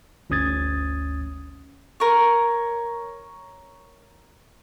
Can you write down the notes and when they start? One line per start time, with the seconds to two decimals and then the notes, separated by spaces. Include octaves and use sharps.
0.30 G1 D2 C#4 D#6 G#6 A6
2.00 A#4 C#5